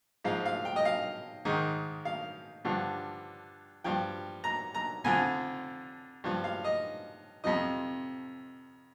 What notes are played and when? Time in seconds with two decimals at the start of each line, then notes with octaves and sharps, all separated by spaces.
0.24 G#2 F3 F5
0.46 F5
0.65 G5
0.76 D#5
0.85 F5
1.45 G#2 D#3
2.05 F5
2.65 G2 D3 F3
3.84 G2 F3 G5
4.44 A#5
4.74 A#5
5.04 F2 D3 F3 G#5
6.24 G2 F3
6.44 F5
6.64 D#5
7.44 F2 C3 F3 D#5